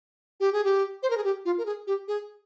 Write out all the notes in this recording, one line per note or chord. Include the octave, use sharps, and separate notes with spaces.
G4
G#4
G4
C5
A#4
G#4
G4
F4
A#4
G#4
G4
G#4